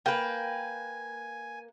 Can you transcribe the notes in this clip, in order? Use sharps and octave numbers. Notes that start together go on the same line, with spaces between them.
A#3 B4 G5 G#5